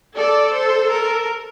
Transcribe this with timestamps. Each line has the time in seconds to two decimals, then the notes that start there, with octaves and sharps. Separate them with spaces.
0.17 A4 D5
0.53 C5
0.90 A#4